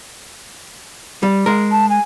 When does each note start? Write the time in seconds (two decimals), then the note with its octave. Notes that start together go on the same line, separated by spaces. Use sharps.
1.23 G3
1.46 G#3 A#4
1.71 A5
1.90 G#5